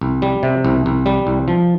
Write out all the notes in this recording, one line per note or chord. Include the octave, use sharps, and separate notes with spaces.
C2
G3
C3
C2
C2
G3
C2
F3